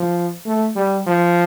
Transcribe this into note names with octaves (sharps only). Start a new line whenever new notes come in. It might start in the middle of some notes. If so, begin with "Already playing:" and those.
Already playing: F3
A3
G3
F3